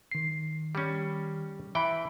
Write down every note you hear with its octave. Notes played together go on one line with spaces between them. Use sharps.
D#3 C7
G3 C#4
E3 E5 G5 B5